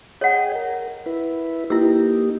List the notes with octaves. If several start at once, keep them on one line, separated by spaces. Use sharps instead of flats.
G#4 C#5 D#5 F#5 G5
A#4
E4 B4
A#3 D#4 E4 G4 E6